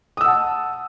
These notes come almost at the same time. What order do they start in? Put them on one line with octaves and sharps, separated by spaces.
D#6 E6 F#5 A5